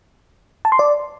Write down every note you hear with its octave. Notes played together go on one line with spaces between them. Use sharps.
A5
C6
D5